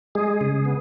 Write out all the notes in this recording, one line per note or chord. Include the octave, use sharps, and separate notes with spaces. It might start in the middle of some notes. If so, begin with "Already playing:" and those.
G#3 G#4
C#3
B3